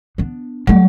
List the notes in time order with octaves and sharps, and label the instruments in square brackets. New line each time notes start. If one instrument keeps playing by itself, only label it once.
[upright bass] B3 D4
[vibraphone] F#3 [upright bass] G3 A3